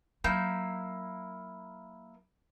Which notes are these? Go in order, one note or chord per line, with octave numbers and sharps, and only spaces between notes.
F#3 A#3 D#4 E4 G6